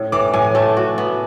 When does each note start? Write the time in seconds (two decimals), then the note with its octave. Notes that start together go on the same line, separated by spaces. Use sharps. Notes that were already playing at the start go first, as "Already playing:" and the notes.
Already playing: A2
0.12 E3 D6
0.34 A2 G#5
0.55 A3 A5
0.77 F#4
0.98 B3